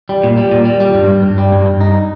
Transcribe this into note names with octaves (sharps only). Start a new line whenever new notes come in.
G3
A#2
G3
A#2
G3
G3
G2
G2
G2
G3
G2
G2
D#4